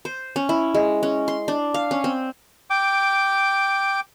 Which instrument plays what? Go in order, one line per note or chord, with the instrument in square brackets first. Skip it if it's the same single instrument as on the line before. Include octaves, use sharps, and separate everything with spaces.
[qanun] C5
C#4
E4
G#3
C#4
C6
D4
F5
C#4
C4
[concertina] G5 D6